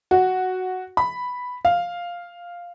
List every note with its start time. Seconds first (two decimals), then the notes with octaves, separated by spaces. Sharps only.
0.11 F#4
0.97 B5
1.65 F5